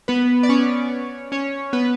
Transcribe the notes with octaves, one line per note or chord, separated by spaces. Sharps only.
B3 B4
D5
C#4 C#5
C#4 C#5
B3 B4